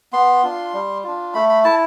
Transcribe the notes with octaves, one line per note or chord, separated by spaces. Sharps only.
B3 C6
D4 F4
G3
D4 F4
A3 B5
B5
E4 A5